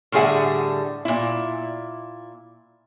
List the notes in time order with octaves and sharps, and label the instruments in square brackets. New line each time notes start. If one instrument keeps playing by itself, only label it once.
[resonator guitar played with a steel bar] A2 D3 G3 G#4 E5 F#5
A#2 E4